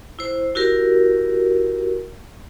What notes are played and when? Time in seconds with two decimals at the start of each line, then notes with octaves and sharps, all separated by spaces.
0.19 E4 C5
0.55 E4 F#4 G4 A#4